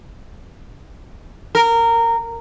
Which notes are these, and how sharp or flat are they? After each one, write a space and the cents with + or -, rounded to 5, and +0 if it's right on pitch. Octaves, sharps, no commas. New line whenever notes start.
A#4 -15